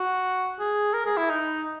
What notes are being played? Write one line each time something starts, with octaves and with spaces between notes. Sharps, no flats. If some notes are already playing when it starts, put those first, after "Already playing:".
Already playing: F#4
G#4
A#4
G#4
E4
D#4